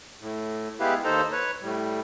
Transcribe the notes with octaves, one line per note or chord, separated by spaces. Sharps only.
A2
G#3 B3 E4 G4 B4 F5
D#2 D#4 A4 C5 A#5
B4 C#5
A2 G3